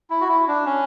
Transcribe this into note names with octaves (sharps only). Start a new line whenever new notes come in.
E4
F#4
E4
D4
C#4